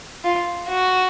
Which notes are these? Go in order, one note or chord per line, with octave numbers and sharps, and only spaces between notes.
F4
F#4